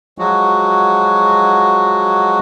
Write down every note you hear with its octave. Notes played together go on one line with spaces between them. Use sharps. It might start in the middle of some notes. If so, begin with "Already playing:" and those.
F3 F#3 G#3 F#4